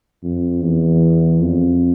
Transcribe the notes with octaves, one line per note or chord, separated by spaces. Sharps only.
F2
E2
F2